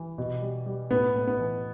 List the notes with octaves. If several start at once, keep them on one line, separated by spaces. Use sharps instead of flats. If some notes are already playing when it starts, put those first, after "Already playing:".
Already playing: E3
B2
G3
G3
A2 B3
A2
B3
E3